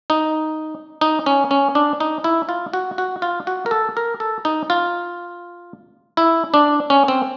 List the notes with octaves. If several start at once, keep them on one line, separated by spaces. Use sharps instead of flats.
D#4
D#4
C#4
C#4
D4
D#4
E4
F4
F#4
F#4
F4
F#4
A#4
A4
A#4
A4
D#4
F4
E4
D4
C#4
C4